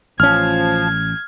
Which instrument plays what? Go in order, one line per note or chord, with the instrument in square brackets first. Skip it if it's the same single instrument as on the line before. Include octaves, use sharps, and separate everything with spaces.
[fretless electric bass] A1 C#4 [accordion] F3 [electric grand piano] F6 [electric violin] G#6